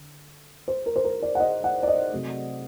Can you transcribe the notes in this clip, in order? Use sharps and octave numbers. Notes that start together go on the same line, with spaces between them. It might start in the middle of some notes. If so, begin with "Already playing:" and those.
Already playing: D3
C5
A#4
C5
A#4
D5
F#5
D#5
F#5
D5
D#5
C3 F#3 A3